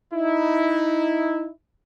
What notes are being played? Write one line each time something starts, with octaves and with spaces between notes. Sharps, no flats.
D#4 E4